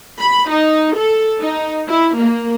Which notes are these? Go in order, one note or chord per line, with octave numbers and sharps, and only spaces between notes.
B5
D#4
A4
D#4
E4
A#3